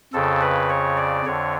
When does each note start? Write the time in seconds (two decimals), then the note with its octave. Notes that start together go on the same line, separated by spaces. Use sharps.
0.13 F2 C#3 A4
0.41 B4
0.69 C#5
0.97 D5
1.26 F2 D3 C#5